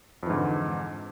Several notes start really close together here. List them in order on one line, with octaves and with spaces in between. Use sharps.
F2 E3 G#2 D3